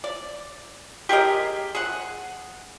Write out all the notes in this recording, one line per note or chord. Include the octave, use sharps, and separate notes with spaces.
D5
G4 G#4 A#4 D#5
G#4 F#5